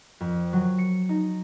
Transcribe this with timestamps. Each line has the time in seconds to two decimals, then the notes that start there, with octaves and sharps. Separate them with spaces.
0.21 F2
0.53 F#3
0.78 C#7
1.09 D#4